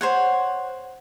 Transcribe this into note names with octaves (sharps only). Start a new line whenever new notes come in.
C5 C#5 F#5